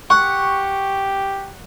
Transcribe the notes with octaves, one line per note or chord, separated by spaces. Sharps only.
G4 F#5 C#6